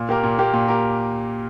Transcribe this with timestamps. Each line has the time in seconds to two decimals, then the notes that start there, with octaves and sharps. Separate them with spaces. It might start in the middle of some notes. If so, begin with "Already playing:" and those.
Already playing: A#2
0.09 A#3 G4 A#4
0.23 A#2
0.39 A#3 G4 A#4
0.53 A#2
0.68 G4 A#4